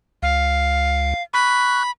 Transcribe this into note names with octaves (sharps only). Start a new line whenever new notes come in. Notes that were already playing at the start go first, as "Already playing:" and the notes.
C#2 F5
B5 C#6 F#6